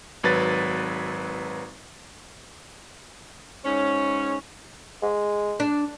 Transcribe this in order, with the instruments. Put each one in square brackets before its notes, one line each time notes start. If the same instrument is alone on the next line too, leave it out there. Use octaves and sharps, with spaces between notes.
[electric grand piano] G#1 F#3 B4 A6
[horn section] G#2 C#4
[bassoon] G#3
[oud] D4